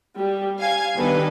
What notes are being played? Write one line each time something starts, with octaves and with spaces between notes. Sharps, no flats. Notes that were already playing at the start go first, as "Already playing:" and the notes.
G3
F5 G#5 G#6
D#3 G3 B3 D4 A4 B4